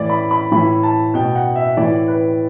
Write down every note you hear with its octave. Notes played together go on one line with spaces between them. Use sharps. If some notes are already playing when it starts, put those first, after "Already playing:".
Already playing: A2 E3 D5
B5
B5
A2 E3 B5
A5
B2 G5
F#5
E5
A2 E3 D5
B4